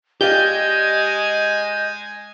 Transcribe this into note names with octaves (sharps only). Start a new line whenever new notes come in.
G#3 G4 D5 D#5 F5 G#5 G6